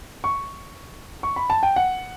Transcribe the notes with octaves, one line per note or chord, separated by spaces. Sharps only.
C#6
C#6
B5
A5
G5
F#5